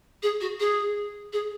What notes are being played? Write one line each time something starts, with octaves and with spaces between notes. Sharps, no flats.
G#4
F#4
G#4
G#4